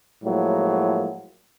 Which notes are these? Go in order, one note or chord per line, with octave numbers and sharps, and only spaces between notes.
A2 F3 F#3 G#3 A#3